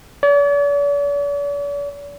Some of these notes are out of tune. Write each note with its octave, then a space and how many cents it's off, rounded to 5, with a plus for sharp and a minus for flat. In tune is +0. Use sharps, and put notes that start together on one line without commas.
D5 -45